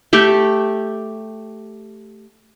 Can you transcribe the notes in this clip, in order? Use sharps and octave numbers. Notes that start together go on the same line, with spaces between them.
A3 G4